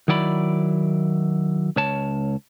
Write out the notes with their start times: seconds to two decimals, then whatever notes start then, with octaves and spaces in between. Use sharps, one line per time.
0.08 D#3 F#3 E4 D5 B5
1.77 C#2 C#5 A5